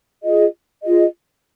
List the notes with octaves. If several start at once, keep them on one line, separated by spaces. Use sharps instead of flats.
F4 G#4 D#5
F4 G#4 D#5